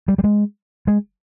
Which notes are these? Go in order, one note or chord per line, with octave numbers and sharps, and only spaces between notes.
G3
G3
G#3
G#3